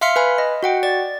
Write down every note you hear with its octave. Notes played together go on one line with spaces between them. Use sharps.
E5 F5 C6 F6 B6 C#7
B4 G#5 B5
D#5
F#4 F#5 G5
D5 A6